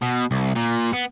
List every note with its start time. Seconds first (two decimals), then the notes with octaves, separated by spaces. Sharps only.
0.02 B2
0.31 C2
0.56 A#2
0.93 B3